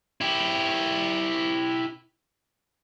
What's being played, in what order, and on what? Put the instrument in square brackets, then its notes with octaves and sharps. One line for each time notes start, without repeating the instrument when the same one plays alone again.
[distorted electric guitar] E4 G4